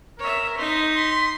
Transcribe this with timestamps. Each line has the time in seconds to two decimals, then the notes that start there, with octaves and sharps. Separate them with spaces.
0.19 A#4 C#5 E5
0.58 D#4 C6 B6
0.96 C6